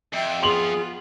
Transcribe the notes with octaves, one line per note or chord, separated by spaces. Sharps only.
F2 E5 G5
B3 F4 G#4 C6 F7 F#7